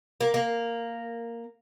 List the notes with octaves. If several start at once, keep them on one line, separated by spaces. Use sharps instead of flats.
A#3
A#3